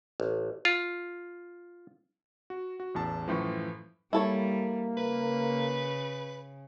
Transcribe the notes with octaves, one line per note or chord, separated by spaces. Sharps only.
A1
F4
F#4
F#4
A1 E2 A5
F#2 A2 E3 F3 C#6
G3 A#3 E4 A4 C#5
C#3 B4